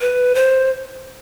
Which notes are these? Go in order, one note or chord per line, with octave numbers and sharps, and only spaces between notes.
B4
C5